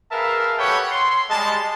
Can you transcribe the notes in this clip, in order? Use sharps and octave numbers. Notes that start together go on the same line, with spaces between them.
G#4 A#4 B4 E5 F5 A5
G4 A4 B4 C#5 F#5 G5
C6
G3 G#3 A5